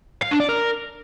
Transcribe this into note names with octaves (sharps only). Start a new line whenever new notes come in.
F5
D4
D5
A#4